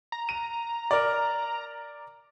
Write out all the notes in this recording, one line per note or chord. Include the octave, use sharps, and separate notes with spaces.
A#5
D#7
A#4 D5